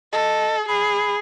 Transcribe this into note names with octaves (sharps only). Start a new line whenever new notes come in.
A4 D#5
G#4 B5